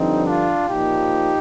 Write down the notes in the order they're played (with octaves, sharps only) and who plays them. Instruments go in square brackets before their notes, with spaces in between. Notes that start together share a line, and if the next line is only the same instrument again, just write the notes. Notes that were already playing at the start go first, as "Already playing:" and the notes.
Already playing: [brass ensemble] G2 D3 F3 C4 D#4
D4 F4
A#2 F3 D#4 G4